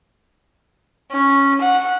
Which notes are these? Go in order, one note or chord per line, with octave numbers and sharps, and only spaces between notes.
C#4
F#5